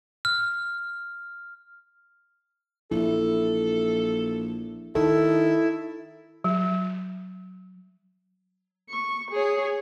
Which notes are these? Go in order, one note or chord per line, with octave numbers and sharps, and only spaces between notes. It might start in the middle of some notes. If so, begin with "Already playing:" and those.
F6
A#1 E4 A4
D#3 E4 A4
F#3
C#6
G#4 C#5